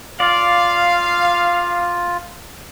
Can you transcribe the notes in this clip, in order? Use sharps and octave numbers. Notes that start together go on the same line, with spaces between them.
F4 D5 F5